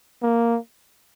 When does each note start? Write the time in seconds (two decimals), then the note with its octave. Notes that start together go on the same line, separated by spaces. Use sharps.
0.23 A#3